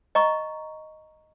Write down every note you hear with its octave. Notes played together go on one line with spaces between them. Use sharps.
D#5 A#5 C#6